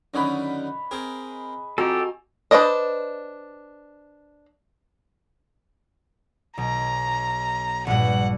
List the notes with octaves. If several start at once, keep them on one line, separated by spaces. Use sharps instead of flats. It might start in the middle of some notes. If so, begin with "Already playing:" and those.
F#2 D3 D#3 B4 C#5 D#5
C4 G#4 A#4
F2 F#4 G4 A4 D#5 G#5 A#5
D4 B4 C5 D5 D#5
B1 A#5
A#1 G2 F#5